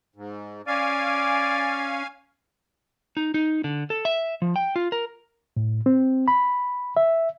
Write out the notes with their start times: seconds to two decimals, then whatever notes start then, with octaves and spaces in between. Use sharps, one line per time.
0.16 G#2
0.67 C#4 D5 F5 G#5 D6
3.17 D#4
3.34 D#4
3.64 D3
3.90 A4
4.05 E5
4.42 F3
4.56 G5
4.76 F4
4.92 A#4
5.57 A2
5.86 C4
6.28 B5
6.97 E5